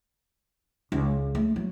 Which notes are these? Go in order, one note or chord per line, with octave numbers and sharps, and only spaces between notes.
C#2
A3
F#3